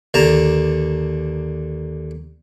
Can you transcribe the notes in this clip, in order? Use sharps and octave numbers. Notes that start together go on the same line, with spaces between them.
D#2 D3 A5 A#5